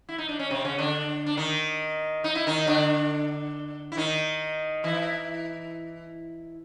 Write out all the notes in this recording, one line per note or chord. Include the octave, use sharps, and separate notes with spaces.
E4
D#4
D4
C#4
C3 C4
C#3 C#4
D3 D4
D4
D#3 D#4
D#4
E4
D#3 D#4
D3 D4
E4
D#3 D#4
E3 E4